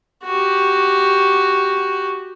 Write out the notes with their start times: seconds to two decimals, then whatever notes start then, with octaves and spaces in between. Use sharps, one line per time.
0.24 F#4 G4